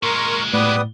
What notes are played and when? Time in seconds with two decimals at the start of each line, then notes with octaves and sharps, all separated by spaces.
0.03 A#2 G#3 A#4 A#5 C6 C#6
0.53 A2 G3 B3 B4 D5 D#6